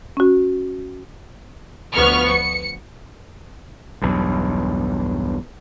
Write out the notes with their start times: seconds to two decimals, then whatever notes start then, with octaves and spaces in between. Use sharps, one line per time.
0.17 C#4 F#4
1.94 D2 F3 B3 C#6 F6
2.31 C#7
4.02 B1 E2 G2